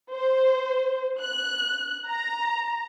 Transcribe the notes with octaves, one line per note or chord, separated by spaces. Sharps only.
C5
F#6
A#5